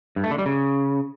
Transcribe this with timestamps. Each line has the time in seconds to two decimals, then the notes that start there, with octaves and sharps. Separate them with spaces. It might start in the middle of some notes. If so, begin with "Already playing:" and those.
0.16 G2
0.24 A3
0.31 D3
0.38 G3
0.46 C#3